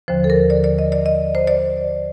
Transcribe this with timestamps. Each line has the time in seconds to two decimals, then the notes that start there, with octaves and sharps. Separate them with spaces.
0.08 D#2 D3 F3 C5
0.24 A4
0.30 A#4
0.50 D5
0.64 D5
0.79 D#5
0.92 D5
1.06 D#5
1.35 C5
1.47 D5